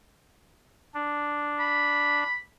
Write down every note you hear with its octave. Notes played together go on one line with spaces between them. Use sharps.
D4
B5